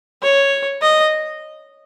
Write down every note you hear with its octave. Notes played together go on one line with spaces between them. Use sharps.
C#5
D#5